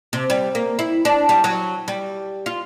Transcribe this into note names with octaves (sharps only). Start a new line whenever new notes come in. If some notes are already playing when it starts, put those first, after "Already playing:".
C3
G3
A#3
E4
D4
G3
F#3
G3
F4